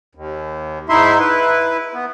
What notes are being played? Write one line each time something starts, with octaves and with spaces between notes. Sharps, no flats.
D#2
G#2 D#4 E4 E5 C6
E4 B4
B3